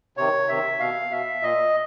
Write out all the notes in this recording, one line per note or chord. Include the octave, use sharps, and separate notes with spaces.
C3 D#3 C#5
C3 D#3 E5
B2 F5
B2 E5
A#2 D#5